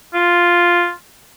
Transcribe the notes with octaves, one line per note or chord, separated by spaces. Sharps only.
F4